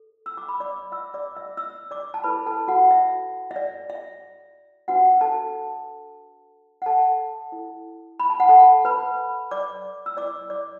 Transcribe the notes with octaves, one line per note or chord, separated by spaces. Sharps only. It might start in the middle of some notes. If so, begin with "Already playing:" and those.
Already playing: A4
E6
D6
B5
D5 D6
E5 E6
D5 D6
E5 E6
E5 E6
D5 D6
A5
E4 A4 B4 B5
A4 A5
F#4 F#5
E5
E5
D5
E5
D4 F#4 B4 F#5
A4 A5
F#5
A4 A5
E4 A4
B5
A5
F#5
A4 A5
B4 B5
D5 D6
E6
E4 B4 D5 D6
D5 D6